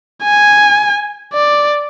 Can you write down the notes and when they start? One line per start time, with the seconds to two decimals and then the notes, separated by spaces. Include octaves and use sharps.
0.23 G#5
1.33 D5